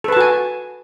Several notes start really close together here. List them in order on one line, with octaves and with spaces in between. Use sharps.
A4 B4 A5 F#4 G#5